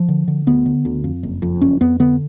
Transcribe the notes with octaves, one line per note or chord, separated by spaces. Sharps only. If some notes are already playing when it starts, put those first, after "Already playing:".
Already playing: F3
D3
D3
D2 B3
D3
D2
F2
F#1
F2
F#1 C#4
F2 B3
D3 B3